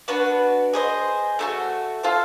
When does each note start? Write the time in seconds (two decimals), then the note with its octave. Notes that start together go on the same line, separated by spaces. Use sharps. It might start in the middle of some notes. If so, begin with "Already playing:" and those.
0.08 B3 D4 F#4 B4
0.73 G#4 C5 D#5
1.39 A3 D4 F#4
2.03 F4 A4 C5